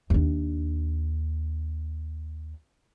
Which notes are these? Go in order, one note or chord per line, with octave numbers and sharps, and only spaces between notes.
D#2 D4